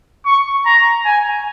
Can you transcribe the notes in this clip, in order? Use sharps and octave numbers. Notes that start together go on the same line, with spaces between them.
C#6
A#5
G#5